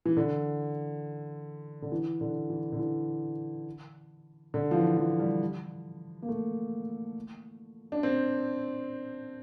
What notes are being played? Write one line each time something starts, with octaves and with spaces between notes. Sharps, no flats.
E3
D3
D3
E3
D3
E3
D3
E3
D3
F3
E3
F3
G3
A#3
A3
D4
C4